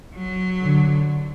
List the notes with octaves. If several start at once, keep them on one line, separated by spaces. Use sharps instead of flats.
F#3
D3